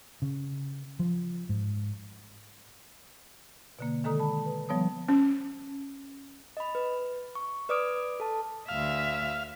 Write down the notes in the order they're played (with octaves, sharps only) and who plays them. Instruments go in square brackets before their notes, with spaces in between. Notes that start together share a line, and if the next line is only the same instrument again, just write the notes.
[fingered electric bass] C#3
F3
G#2
[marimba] B2 D3 A#3
D3 D#3 G#3 A4 A#5 D#6
A5 B5
B4
F3 G3 B3 C#5 A5 D#6
[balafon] C#4
[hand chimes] D#5 B5
B4
C#6
B4 D5 D6 D#6 F6 D7
A4 A5
[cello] D2 E5 [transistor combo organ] F5